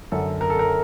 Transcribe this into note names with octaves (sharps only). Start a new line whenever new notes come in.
F#2 D3 A4
A#4
A4
A#4